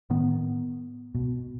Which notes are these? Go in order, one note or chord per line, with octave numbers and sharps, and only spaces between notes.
A2 D#3 B3
B2